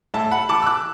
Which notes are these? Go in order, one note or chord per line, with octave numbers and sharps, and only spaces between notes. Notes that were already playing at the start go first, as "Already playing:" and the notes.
A2 E5 A5
F#5 B5
E3 A5 D6
E6
D6 F#6